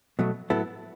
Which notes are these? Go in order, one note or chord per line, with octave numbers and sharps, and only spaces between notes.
B2 F#3 A3
A2 F#3 B3 E4 A4